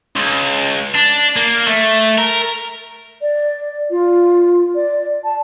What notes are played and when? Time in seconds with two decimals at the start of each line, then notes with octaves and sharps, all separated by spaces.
0.16 C#2
0.95 D4
1.36 A#3
1.67 A3
2.18 A#4
3.22 D5
3.91 F4
4.75 D5
5.24 A5